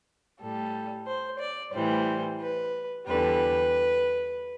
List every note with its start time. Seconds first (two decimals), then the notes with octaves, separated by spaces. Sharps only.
0.40 A2 G3 A4
1.06 C5
1.40 D5
1.73 A2 E3 G3 C5
2.41 B4
3.07 E2 D3 G3 B4